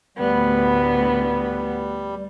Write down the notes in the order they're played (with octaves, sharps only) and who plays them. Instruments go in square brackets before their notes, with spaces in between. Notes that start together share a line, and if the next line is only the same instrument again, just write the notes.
[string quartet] D2 A2 B3 [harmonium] G3